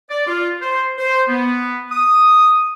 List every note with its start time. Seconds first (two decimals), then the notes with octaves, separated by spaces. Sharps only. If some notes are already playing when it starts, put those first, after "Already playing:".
0.10 D5
0.27 F4
0.61 C5
0.98 C5
1.29 B3
1.91 D#6